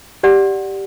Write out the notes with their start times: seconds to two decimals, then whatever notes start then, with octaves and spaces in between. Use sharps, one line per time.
0.23 G4 D5 F#5